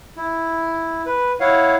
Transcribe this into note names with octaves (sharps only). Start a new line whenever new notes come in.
E4
B4
E4 C#5 F5 F#5